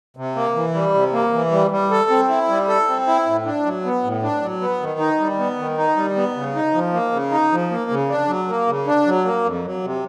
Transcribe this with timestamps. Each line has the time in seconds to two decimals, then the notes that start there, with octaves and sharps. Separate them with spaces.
0.17 C3
0.35 A#3
0.55 E3
0.74 G3
0.94 C3
1.13 A#3
1.33 E3
1.51 G3
1.71 G3
1.91 A4
2.10 C4
2.29 E4
2.48 G3
2.68 A4
2.88 C4
3.07 E4
3.26 A2
3.45 D4
3.65 F#3
3.84 B3
4.03 A2
4.23 D4
4.42 F#3
4.61 B3
4.81 D#3
4.99 D#4
5.20 G3
5.39 B3
5.58 D#3
5.78 D#4
5.96 G3
6.16 B3
6.36 C#3
6.55 D#4
6.74 F3
6.93 A#3
7.12 C#3
7.31 D#4
7.52 F3
7.71 A#3
7.91 C#3
8.09 D4
8.28 F#3
8.48 A#3
8.67 C#3
8.87 D4
9.06 F#3
9.25 A#3
9.45 F2
9.65 F#3
9.83 C3